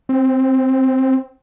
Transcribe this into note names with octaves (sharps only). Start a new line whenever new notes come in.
C4